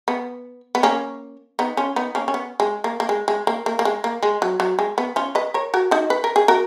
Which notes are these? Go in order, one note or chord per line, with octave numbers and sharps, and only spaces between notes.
B3
B3
A#3 C#4
B3 D#4
C#4 F4
B3 D#4
A#3 C#4
C#4
B3
G#3
A#3
A#3
G#3
G#3
A#3
A#3
A#3
G#3
A#3
G#3
F#3
F#3
G#3
B3
C#4 F4
B4 D#5
A#4 C#5
F#4 A#4
D#4 F#4
B4
A#4
G#4
F#4 A#4